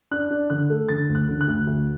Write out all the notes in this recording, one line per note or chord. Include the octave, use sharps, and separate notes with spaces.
D4 F#6
D4
D3 F#6
A3
D3 A6
D2
F#6
D3
F#6
D2
D2